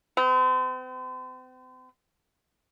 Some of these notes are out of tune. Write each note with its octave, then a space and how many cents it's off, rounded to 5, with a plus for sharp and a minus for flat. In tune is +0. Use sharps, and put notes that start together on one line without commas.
C4 -40